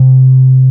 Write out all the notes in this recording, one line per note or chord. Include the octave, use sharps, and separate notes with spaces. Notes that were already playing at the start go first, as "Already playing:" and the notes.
Already playing: C3